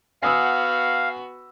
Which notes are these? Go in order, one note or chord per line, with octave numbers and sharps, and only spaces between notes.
B3 F#4 F5 G#5 D#6 E6